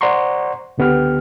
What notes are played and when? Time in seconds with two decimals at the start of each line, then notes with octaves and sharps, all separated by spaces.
0.01 C5 D5 F#5 A#5 C6 C#6
0.78 C#2 D3 B3 G4 F6